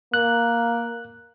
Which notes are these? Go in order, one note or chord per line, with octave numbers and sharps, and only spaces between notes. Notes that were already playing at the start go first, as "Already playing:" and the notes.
A#3 F#6